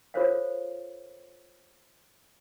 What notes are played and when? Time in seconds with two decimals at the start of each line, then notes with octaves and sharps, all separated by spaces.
0.14 F4 A4 A#4 C5 C#5 F5